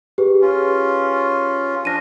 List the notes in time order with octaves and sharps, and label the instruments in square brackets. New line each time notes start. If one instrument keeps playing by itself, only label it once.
[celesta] G4 G#4 B4
[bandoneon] C#4 F4
[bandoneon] F3 D4 [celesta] A#6 D#7